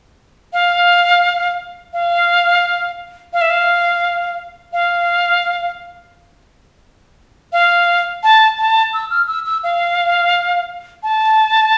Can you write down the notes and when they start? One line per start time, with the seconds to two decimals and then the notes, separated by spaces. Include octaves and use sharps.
0.53 F5
1.93 F5
3.33 F5
3.41 E5
3.50 F5
4.73 F5
7.52 F5
8.23 A5
8.58 A5
8.94 E6
9.10 F6
9.27 E6
9.46 E6
9.64 F5
11.03 A5